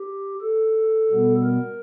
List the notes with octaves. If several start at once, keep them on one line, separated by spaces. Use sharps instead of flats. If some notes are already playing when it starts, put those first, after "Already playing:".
Already playing: G4
A4
B2 G3 B3
A#4